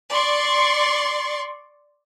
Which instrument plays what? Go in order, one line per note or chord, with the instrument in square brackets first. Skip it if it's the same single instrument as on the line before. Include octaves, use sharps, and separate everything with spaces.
[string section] D5 C6 C#6